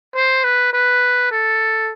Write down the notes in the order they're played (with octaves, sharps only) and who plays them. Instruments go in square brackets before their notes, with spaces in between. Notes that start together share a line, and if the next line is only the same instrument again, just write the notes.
[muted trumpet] C5
B4
B4
A4